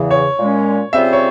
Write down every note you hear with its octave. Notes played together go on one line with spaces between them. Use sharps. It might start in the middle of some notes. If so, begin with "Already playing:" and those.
Already playing: E2 C#3 E3
C#5
A#2 G#3 C#4
C#3 G3 C4 F4 C5 E5
C#5